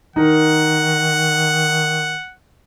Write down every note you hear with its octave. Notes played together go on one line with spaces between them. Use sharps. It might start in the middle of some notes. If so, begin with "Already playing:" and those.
D#3 D#4 A#4 F#5